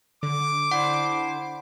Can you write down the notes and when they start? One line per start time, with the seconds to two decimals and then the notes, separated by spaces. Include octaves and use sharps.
0.23 D3 D6
0.71 D4 E4 C5 F#5